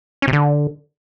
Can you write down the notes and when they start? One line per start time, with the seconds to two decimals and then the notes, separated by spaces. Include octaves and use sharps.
0.22 C#4
0.28 C3
0.33 D3